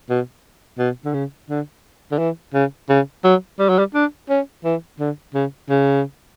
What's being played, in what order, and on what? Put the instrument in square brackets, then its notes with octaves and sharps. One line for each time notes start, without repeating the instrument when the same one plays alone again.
[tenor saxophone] B2
B2
D3
C#3
D3
D3
E3
C#3
C#3
F#3
G3
F#3
G3
D4
C#4
E3
D3
C#3
C#3